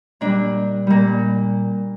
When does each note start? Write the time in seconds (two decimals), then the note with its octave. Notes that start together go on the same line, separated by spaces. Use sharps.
0.21 A#2 G3 D4
0.87 A#2 G3